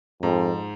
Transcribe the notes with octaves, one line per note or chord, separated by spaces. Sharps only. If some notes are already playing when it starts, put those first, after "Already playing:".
F2 G#2